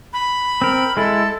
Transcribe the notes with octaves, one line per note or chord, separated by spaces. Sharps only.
B5
C4 A#4
G#3 E4 A4